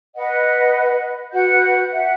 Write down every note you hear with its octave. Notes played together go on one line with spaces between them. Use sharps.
B4 D#5 F#5
F#4 B4 F#5 G6
E5 F#5